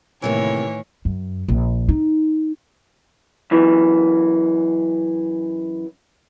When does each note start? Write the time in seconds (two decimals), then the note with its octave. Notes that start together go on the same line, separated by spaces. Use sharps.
0.22 D2 A2 C3 D#3 E3 A#3 C#5
1.05 F#2
1.48 A#1
1.89 D#4
3.51 F#2 E3